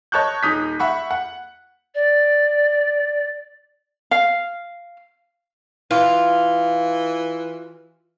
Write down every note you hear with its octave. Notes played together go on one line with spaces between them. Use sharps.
C#5 D#5 A5 C#6 F#6 G6
D#1 D#4 D#6 G6 B6
E5 F#5 B5 C#6
F#5
D5
F5
E3 F4